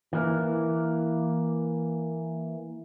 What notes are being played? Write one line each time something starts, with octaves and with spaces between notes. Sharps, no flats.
E3 A#3